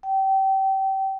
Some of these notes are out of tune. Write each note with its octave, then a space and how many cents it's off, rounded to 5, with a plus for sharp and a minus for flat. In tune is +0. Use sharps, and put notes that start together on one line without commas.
G5 -25